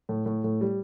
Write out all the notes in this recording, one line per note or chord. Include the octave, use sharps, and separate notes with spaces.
A2
A2
A2
G3